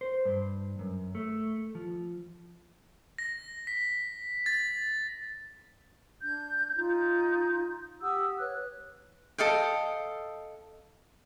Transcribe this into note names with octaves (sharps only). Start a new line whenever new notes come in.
C5
G2
F#2
A3
F3
A#6
B6
A6
D4 G6
D#4 F4 G6
G4 F#5 D#6 E6
B4 C#5 F#6
A4 D#5 F5 G5